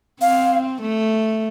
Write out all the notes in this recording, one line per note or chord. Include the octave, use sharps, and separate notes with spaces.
C4 F5
A3